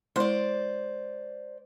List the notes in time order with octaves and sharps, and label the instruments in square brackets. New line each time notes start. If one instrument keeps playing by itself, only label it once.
[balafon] G#3 E4 C6 [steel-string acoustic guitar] C5 D5